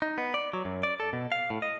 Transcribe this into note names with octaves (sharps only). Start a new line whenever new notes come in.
D#4
B3
D5
F#3
F#2
D5
A4
B2
F5
A2
D#5